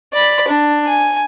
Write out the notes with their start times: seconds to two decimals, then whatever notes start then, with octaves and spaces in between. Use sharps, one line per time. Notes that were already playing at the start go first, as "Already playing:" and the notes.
0.13 D5 B5
0.48 D4
0.86 G#5